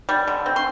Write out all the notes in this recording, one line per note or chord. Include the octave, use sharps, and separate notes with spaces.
G3
D3
C4
C6